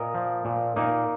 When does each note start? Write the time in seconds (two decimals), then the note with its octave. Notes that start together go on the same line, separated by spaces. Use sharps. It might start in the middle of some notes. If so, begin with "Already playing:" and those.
Already playing: A#2 A#4 D#5
0.14 F3
0.45 A#2
0.76 A#2 A#3 D#4